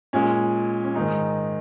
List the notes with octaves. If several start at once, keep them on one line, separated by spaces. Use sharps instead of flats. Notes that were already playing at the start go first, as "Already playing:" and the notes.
A#2 G#3 C#4
C#4
G#2 D#3 G#3 D#4